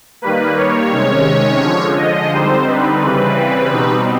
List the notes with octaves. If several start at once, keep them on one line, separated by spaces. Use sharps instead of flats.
D#3 G3 A#3 B4
C#5
C3 D#3 G#3 C#4
D3 F3 G#3
D#5
D3 G3 C4 D#4 C5
B4
C#3 E3 G3 C4
B2 G3 C4 D#4